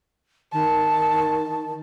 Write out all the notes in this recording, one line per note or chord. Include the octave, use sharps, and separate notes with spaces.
D#3 A5